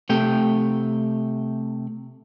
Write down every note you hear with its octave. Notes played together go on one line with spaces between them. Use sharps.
C3 A3 G5